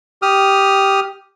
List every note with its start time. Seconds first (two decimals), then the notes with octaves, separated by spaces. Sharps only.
0.22 G4 D#6 F6